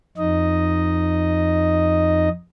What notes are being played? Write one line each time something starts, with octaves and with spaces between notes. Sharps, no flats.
F2 D#4 D#5